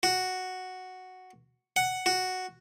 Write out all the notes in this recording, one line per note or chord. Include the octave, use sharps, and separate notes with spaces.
F#4
F#5
F#4